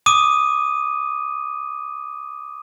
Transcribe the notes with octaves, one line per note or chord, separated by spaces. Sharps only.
D6 D#6 D#7